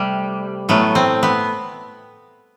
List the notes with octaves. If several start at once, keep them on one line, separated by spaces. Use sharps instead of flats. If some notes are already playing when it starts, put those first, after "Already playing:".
Already playing: C3 G3 A3
A2 F#3 A3 B3
C4
B3